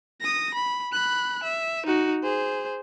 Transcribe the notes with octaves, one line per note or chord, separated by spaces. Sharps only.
D#6 A#6
B5
B5 F#6
E5
D#4 F#4
G#4 C5